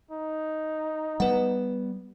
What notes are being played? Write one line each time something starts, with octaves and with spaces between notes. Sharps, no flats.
D#4
G3 B3 B4 F#5